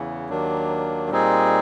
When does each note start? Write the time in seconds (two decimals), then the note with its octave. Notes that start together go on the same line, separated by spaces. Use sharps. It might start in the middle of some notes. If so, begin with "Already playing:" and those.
Already playing: E2 C#3 E3
0.29 D#2 D#3 F#3 A#3 D4
1.10 A#2 G3 C4 D#4 G#4